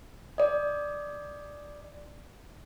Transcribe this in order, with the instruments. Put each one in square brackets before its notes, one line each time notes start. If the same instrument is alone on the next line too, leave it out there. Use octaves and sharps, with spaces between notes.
[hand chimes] D5 D#5